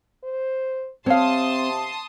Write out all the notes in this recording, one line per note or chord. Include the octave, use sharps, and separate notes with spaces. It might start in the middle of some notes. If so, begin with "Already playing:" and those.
C5
C3 C4 C#5 F5 A5 C6 D#6